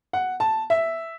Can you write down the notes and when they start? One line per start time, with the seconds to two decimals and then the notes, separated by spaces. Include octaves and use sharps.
0.13 F#5
0.40 A5
0.70 E5